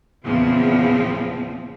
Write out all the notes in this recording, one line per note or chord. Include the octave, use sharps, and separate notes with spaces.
E2 A#2 C#3 F3 C4